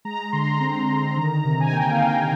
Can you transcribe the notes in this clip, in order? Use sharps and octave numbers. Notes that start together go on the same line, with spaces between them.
G#3 A#5
D3 C6
A#5
C4
D3
D#3
C3
G#5
A#3 G5
F5
C3 G5
F5